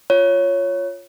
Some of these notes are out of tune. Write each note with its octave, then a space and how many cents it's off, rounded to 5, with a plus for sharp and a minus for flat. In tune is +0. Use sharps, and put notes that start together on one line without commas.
F4 +0 C#5 +0